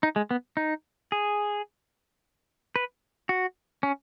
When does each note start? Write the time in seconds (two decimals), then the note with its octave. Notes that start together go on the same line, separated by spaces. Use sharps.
0.03 D#4
0.16 G#3
0.31 B3
0.57 D#4
1.12 G#4
2.76 B4
3.29 F#4
3.83 C#4